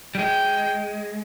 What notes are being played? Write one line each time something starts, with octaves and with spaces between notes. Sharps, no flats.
G3
G#3 G5